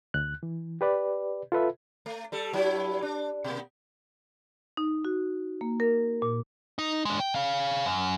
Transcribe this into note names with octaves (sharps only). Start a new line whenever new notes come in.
D2 F#6
E3
G4 B4 D5
F4 A4 B4 E5
A3
G3 A4
G2 F#3 E4
D4
B2 A#3
D#4
F#4
A#3
A#4
A#2
D#4
G#3 D4
G5
G#4 F5
F#2